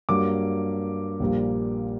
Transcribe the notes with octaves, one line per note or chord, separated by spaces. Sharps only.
G2 F#3 A#3 D6
A#1 A#2 G3 A#3